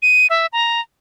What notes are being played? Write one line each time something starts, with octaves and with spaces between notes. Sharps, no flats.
D#7
E5
A#5